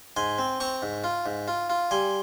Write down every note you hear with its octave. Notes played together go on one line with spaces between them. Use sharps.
G#2 G#5 C6
C4
C4 A#5 C#6
G#2
F4
G#2
F4
F4
G3 G#5 C6